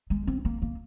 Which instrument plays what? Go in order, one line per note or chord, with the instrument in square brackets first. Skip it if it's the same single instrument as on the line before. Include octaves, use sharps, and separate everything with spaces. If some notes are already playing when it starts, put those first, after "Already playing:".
[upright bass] G#3
C4
A#3
A#3